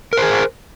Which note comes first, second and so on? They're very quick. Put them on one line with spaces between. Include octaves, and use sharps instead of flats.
A#4 C5 G#4